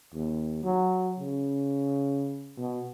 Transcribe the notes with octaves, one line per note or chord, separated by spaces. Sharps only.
D#2
F#3
C#3
B2